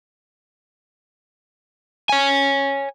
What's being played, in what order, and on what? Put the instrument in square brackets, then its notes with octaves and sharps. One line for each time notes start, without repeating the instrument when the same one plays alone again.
[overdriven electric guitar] C#5 G#5